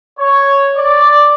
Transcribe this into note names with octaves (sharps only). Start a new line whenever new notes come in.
C#5
D5